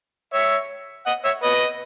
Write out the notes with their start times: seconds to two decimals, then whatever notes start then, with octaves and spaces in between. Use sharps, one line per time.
0.33 C#5 E5
1.06 D#5 F#5
1.25 C#5 E5
1.43 B4 D#5